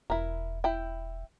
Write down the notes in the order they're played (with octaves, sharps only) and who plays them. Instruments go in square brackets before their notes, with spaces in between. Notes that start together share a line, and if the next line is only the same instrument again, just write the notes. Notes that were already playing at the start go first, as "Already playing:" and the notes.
[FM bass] E1 [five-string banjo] E4 A#4
[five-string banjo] E4 G5